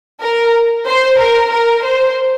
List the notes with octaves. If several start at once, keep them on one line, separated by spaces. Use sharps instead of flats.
A#4
C5
A#4
A#4
C5